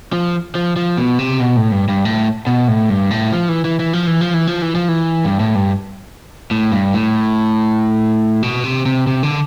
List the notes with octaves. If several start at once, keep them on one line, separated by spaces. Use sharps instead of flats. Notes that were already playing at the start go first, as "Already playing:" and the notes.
F3
F3
F3
B2
C3
B2
A2
G2
G2
A2
B2
A2
G2
A2
F3
E3
E3
E3
F3
E3
F3
E3
F3
E3
F3
E3
G2
A2
G2
A2
G2
A2
B2
C3
C3
C3
D3